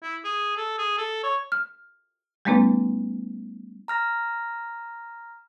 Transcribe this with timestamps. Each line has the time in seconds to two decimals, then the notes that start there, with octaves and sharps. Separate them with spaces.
0.03 E4
0.24 G#4
0.57 A4
0.78 G#4
0.98 A4
1.24 C#5
1.52 F6
2.45 G3 A3 B3 C#4 D#4 B4
3.88 A#5 F6 A#6